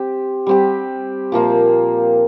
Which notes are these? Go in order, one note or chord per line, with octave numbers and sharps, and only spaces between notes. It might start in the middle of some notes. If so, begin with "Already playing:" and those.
Already playing: C4 G4
G3 C4 G4
A#2 F3 A#3 F4